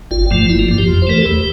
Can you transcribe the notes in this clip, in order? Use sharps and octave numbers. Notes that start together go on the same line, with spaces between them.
G1 F4
G2 F3 A3
G1 E4
A#3
G2 F3 F4
G4
F2
C5
E3 A3 A#4
A4
E2 G4